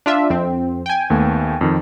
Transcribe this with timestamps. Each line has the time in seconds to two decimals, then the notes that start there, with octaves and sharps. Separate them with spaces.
0.06 D4 F4 E5
0.30 F2 C4
0.86 G5 G#5
1.10 D#2 A3 B3
1.61 F2 D#3